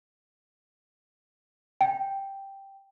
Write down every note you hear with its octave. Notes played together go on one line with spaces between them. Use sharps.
G5